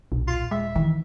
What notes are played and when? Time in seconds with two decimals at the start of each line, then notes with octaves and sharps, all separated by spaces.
0.12 D#1 B1
0.28 F4
0.51 G#3 E5
0.76 D#3 E3